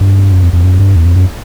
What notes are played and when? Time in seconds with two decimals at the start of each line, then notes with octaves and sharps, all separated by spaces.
0.01 G2
0.32 F#2
0.42 F2
0.53 F2
0.64 F#2
0.80 G2
0.96 E2
1.05 F2
1.16 F#2